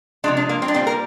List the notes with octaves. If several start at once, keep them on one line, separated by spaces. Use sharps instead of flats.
C3 F3 G#3 D4
D4
A#3
C4
D4
A#2 G3 C4
A#4